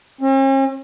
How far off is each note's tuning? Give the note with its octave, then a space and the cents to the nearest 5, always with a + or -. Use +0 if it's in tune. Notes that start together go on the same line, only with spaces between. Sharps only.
C#4 -45